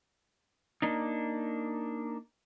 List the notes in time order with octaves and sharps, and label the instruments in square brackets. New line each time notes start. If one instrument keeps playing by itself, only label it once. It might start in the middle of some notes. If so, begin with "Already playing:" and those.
[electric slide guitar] A#3 D4 D#4